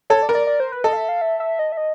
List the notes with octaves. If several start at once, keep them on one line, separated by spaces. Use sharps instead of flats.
A4 C#5
D5
A#4
D5
D5
C5
B4
A4 D#5
F5
E5
F5
E5
E5
D#5
E5
D#5